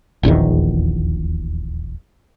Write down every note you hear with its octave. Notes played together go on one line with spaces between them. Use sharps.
D#1 A#1 E2 D#3